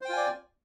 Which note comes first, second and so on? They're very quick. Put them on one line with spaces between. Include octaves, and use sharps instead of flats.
C5 G5 F4 G#5 D5